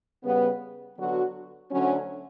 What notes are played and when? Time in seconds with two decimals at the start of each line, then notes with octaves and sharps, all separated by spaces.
0.23 C#3 G3 B3
0.96 D3 F#3 B3 F#4
1.70 D2 D3 F#3 C#4